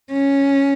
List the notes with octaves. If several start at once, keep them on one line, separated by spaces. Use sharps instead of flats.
C#4